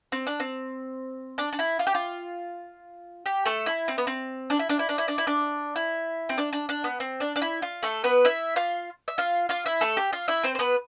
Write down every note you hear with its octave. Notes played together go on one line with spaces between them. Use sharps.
C4
D4
C4
D4
D4
E4
F4
G4
F4
G4
A3 A4
E4
C4
B3
C4
D4
E4
D4
E4
D4
E4
D4
E4
D4
E4
C4
D4
D4
D4
B3
C4
D4
D4
E4
F4
A3 A4
B3 B4
E4 E5
F4 F5
E5
F4 F5
F4 F5
E4 E5
A3 A4
G4
F4 F5
E4 E5
C4 C5
C5
B3 B4